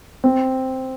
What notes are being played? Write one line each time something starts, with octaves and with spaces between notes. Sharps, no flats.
C4